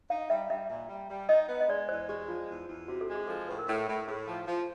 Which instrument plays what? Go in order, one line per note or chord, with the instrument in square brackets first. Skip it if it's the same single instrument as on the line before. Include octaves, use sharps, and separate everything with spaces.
[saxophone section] D#4 [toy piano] F5
[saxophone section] G3 [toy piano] E5
[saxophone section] G3 [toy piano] E5
[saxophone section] A#2
G3
G3
[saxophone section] D#4 [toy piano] D#5
[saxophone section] B3
[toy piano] D#5
[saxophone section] G#3 [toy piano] D5
[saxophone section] E2 [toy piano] C5
[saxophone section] G#3 [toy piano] G4
[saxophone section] F3 [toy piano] F4
[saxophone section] E2
E2
[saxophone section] C3 [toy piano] F#4
[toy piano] A4
[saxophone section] G#3
[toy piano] G#4
[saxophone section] F3 [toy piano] A4
[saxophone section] A2 [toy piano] B4
[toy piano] A#4
[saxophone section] A2 [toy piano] A4
[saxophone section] A2
[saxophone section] A2 [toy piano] G#4
[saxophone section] F3
F3